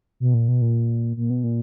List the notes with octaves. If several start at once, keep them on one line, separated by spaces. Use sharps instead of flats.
B2
A#2
B2
A#2
A#2
B2
A#2